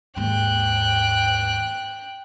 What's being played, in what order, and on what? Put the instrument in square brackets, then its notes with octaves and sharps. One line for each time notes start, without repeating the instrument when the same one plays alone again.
[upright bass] D#2 G#2 [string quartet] G5 F#6